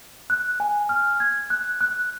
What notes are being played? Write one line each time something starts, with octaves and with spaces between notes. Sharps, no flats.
F#6
G#5
F6
G#6
F#6
F#6